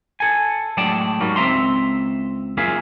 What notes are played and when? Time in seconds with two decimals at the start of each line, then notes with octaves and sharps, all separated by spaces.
0.20 A4 G#5
0.77 A2 F#3 G#3 D5 G5 A5
1.21 G#2 F#3 G3 A#3
1.36 C#2 C4 E5 A#5 C6
2.57 F#2 A#3 F4 G#4 E5